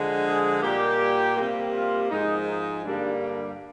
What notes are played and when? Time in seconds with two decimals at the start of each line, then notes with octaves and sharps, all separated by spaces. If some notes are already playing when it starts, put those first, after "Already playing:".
Already playing: D3 F3 G#3
0.25 G#4
0.62 A#2 G3 A#3 G4
1.37 C3 G3 A#3
1.74 F4
2.11 G#2 F3 G#3 D#4
2.48 D#4
2.84 G2 D3 G3 A#3 D4
3.21 D4